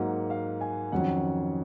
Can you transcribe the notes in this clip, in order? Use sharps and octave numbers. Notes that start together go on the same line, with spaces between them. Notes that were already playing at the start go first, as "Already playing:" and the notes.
Already playing: G#2 F#3 A#3 F#5
F5
G#5
F2 D#3 F#3 C#4 F#5